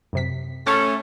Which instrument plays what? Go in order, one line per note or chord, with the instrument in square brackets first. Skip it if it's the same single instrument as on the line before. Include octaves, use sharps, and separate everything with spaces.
[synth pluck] F#2 C3 B6
[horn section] A3 C#4 [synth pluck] C#6 F6 A6